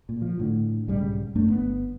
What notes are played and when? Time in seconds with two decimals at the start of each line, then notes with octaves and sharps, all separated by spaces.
0.09 A#2
0.22 F3
0.39 A2 D3
0.88 B1 G#2 C#3 G3
1.35 F#2 A3 D4
1.50 G1 B3